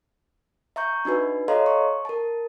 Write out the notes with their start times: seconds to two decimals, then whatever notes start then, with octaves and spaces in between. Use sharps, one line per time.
0.76 E5 A#5 C#6 G6
1.05 D4 D#4 F#4 B4
1.48 A4 C#5 D#5 F5 A#5 C6
1.66 C#6
2.05 A#4 A5